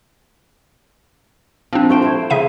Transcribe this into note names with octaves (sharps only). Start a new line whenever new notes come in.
F3 C4 D4
A3 C5 G5
A3 E4
C#3 E5 D#7